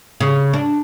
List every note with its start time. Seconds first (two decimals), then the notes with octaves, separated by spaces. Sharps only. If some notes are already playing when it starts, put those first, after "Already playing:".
0.20 C#3
0.54 D4